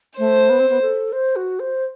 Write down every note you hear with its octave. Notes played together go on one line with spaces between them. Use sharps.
A3 C5
B3
C4
B3
A4
C5
F#4
C5